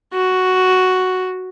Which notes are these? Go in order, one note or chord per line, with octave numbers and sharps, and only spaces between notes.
F#4